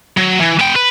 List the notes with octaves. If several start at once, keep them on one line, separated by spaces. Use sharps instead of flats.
F#3
E3
B3 G5
B4